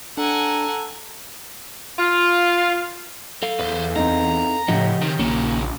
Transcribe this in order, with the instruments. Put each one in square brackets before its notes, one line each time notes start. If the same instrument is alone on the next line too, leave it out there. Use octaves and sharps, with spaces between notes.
[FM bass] D4 [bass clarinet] A4 [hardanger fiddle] F#5 G#5 [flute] A#5
[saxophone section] F4
[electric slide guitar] A4 F5
[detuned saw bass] E2 [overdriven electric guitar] B4 C5
[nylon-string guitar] C4 D#4 [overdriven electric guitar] A#5
[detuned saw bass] A2 [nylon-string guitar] C#3 G4 [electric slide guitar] F3 D#5 F#5
[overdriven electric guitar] C3 [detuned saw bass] D#3
[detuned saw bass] A#1 [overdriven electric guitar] A#2 D#3 [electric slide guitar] A#3 C#4